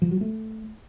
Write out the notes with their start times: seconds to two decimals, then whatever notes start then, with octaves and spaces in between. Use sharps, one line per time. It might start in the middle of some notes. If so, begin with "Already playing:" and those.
0.02 F3
0.11 F#3
0.21 A3